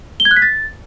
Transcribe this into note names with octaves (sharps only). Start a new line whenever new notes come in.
G7
G#6
F#6
B6
A6